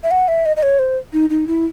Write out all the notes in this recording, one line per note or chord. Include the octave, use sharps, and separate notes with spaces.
E5
F#5
E5
D#5
D#5
C#5
C5
D#4
D#4
E4